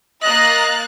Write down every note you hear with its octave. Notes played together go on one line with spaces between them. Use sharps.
A#3 D#5 F#6 A6